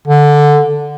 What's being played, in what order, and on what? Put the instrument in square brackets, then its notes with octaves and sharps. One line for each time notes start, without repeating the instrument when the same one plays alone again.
[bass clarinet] D3